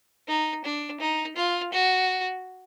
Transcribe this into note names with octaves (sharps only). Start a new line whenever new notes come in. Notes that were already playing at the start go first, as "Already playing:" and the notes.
D#4
D4
D#4
F4
F#4